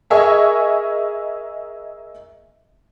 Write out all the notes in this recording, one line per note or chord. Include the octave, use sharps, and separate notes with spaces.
G#4 A#4 D#5 E5 G#5 C#6